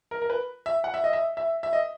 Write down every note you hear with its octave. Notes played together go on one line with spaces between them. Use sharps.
A#4
A#4
B4
E5
F#5
E5
D#5
E5
E5
E5
D#5